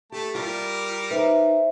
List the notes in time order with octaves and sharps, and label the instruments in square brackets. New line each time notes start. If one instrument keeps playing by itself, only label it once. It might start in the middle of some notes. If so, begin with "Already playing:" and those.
[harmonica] A3 A5 [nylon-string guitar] G4
[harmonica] G3 A#4 [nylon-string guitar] F4 D5
[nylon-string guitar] D#4 B4 [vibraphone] C5 E5